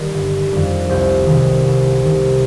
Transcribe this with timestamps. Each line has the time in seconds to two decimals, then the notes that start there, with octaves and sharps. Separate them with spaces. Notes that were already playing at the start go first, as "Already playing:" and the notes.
Already playing: D#3 G3 A#4
0.14 G1
0.52 F2 D#3 G3
0.89 C2 C5
1.27 C3 D#3
1.65 C2
2.03 C3 D#3